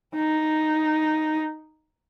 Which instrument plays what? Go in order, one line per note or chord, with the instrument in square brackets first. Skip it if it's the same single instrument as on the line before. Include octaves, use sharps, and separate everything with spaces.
[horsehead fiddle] D#4